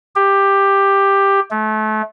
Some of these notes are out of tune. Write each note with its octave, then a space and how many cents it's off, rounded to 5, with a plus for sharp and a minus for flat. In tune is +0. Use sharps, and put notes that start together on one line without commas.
G4 +10
A3 -30